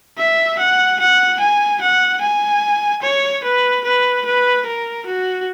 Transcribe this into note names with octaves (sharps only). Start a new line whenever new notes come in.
E5
F#5
F#5
G#5
F#5
G#5
C#5
B4
B4
B4
A#4
F#4